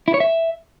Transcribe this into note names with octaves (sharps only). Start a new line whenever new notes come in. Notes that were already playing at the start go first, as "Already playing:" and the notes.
E4
C#5
E5